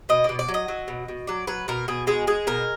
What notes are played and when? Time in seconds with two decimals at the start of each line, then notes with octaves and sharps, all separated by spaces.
0.09 B2 D#5
0.24 B2 D5
0.39 D5
0.48 F#3
0.54 D#5
0.68 F#3
0.88 B2
1.08 B2
1.27 F#3 D5
1.47 F#3 B4
1.68 B2 A#4
1.88 B2 G#4
2.07 G#3 G#4
2.27 G#3 G#4
2.47 B2 A#4